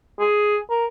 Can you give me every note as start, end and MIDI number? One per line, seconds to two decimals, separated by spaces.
0.20 0.59 68
0.70 0.86 70